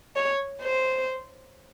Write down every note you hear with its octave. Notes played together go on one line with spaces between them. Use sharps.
C#5
C5